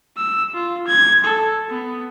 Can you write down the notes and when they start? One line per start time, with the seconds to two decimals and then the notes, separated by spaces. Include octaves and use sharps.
0.17 E6
0.54 F4
0.87 G#6
1.24 A4
1.69 B3